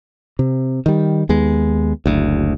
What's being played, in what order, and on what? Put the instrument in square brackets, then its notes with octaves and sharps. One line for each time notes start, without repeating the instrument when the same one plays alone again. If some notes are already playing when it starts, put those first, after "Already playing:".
[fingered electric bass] C3
D#3 G3
D#2 G#3 B3
F#1 D2